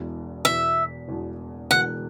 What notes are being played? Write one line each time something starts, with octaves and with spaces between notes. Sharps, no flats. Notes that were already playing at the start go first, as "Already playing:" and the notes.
Already playing: E1 E2 B2
E1 E2 B2 E5
E1 E2 B2
E1 E2 B2 F#5